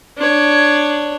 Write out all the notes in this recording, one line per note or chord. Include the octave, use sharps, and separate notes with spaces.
D4 C#5